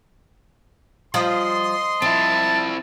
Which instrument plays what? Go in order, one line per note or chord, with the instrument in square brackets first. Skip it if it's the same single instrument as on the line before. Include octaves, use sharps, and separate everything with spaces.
[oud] F3 G3 [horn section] D#5 C6
[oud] F3 [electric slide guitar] C4 E4 [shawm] A5